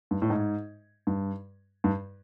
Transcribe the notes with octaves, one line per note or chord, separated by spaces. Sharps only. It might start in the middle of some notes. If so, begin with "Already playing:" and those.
G2
A2
G#2
G2
G2